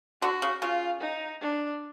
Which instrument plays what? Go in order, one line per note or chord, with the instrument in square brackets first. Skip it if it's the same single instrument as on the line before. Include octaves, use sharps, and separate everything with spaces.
[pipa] D3 [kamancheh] F#4
[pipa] C#3
[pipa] C#3 [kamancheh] F4
[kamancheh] D#4
D4